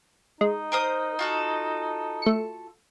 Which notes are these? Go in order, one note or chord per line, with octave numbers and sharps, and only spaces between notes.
G#3 D#4
A#4 C5 D#6
F4 F#4 A4
A3 C#7